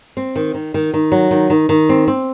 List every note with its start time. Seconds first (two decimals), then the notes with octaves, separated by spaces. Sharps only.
0.17 C4
0.36 D#3
0.54 D#3
0.74 D#3
0.94 D#3
1.12 F#3
1.31 D#3
1.50 D#3
1.69 D#3
1.89 C4
2.08 C4